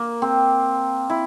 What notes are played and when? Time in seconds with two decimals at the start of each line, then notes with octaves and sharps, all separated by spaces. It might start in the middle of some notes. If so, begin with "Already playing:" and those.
Already playing: A#3
0.22 C4
1.10 E4